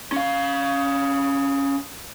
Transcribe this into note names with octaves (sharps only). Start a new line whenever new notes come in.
C#4 F5